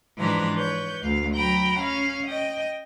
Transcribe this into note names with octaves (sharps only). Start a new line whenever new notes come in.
G#2 E3 F3 D4 B4 A#5
B4 C#5 G6
D2 F5
F#3 G5 A#5 B5
C#4 F5
D#5 G5